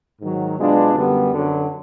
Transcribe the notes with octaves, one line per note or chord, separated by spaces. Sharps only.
G#2 D#3 F#3
B2 G#3 B3 D4 F4
F#2 D3 G3 B3
F#2 D3 F#3